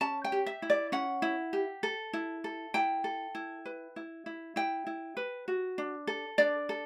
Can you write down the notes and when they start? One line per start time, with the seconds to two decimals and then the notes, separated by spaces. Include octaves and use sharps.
0.01 C#4 A5
0.24 G5
0.32 G4
0.46 E5
0.62 E4
0.70 D5
0.92 C#4 F#5
1.22 E4
1.53 G4
1.83 A4
2.13 E4
2.44 A4
2.74 E4 G5
3.04 A4
3.35 E4
3.66 B4
3.96 E4
4.26 E4
4.56 E4 G5
4.87 E4
5.17 B4
5.48 F#4
5.78 D4
6.07 A4
6.38 D4 D5
6.69 A4